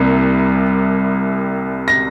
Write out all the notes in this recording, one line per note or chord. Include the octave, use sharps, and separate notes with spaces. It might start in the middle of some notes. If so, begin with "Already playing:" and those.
Already playing: C2 C3 G3 A#3
A#6